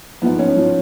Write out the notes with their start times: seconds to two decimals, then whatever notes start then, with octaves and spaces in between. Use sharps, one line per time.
0.22 G#2 F3 B3
0.39 C#4
0.57 F3